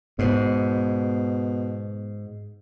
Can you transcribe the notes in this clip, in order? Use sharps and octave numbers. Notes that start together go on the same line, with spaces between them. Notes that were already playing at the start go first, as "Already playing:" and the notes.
G#2 B2